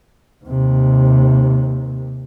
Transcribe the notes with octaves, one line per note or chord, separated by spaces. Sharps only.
D#2 C3